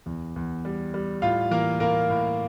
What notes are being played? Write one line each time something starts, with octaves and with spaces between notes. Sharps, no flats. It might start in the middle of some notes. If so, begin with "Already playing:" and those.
E2
E2
G3
G3
A2 F4 F5
E3 A#3 A#4
A2 A#3 A#4
A2